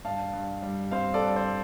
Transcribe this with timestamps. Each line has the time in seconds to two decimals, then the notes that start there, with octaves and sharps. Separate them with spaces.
0.04 G2 F5 A5
0.33 G2
0.63 G3
0.91 C4 C5 F5
1.14 A4 D5
1.22 G2
1.36 C5